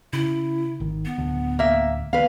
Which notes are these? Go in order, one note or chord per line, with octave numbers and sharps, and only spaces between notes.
C#3 E4
G#1 D#3
B3
D1 D2 D3
A#3 E5
D#3 A#3 B3 B4 F5